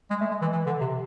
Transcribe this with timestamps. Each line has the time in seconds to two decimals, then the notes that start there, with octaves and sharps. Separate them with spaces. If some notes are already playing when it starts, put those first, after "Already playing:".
0.10 G#3
0.21 A3
0.31 G#3
0.41 E3
0.52 E3
0.66 D3
0.81 C3